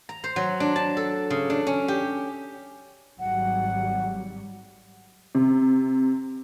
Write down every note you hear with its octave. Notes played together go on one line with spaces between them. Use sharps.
A#5
C5
F#3
D4
A5
A4
C#3
D4
C#4
G4
G#1 F#3 G3 F#5
C3